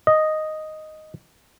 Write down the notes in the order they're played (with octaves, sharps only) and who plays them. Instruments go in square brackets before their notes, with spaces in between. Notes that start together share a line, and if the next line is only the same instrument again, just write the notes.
[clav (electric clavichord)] D#5